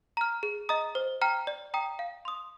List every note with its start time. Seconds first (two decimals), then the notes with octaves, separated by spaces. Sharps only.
0.17 A#5 F6
0.43 G#4
0.69 D#5 A#5 D#6
0.95 C5
1.21 G5 A#5 F6
1.47 D5
1.74 G5 A#5 D#6
1.99 F5
2.25 C6 D#6